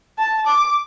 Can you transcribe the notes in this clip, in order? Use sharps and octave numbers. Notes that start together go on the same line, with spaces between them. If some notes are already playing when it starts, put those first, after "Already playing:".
A5
D6